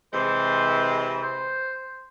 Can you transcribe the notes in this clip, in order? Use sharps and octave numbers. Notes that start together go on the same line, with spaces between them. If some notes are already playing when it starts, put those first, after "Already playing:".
C3 E3 G#3 C5
C5